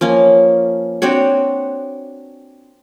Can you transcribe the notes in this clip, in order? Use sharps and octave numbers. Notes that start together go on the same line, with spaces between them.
F3 A#3 C#4
C4 D4 F#4 C#5